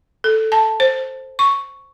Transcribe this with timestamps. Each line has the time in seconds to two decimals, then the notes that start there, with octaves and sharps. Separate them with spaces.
0.24 A4
0.52 A5
0.80 C5
1.39 C#6